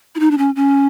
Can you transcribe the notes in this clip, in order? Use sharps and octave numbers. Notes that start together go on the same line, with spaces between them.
E4
D#4
D4
C#4
C#4